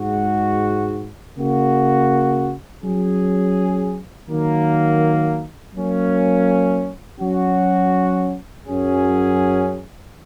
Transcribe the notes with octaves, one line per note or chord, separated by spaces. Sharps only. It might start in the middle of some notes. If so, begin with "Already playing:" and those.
Already playing: G#2 G#3 F#4
C#3 A#3 F#4
F#3 C#4 G#4
D#3 F#3 A#3
F#3 A#3 C#4
F#3 C#4 F#4
F#2 F#3 C#4 G#4